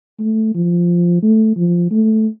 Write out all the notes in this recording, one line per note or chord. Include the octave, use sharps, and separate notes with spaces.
A3
F3
A3
F3
A3